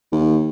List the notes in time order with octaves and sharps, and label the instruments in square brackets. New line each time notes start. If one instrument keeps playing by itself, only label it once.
[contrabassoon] D#2